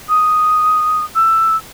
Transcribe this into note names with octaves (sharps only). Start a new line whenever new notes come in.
D#6
E6